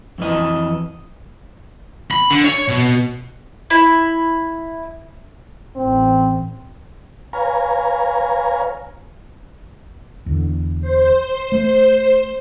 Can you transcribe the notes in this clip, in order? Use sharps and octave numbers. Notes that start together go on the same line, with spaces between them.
F2 E3 D#5
B5
D3
C#5
B2
E4
A1 C4
B4 C#5 F5 G#5 A#5
E2 D3
C5
A3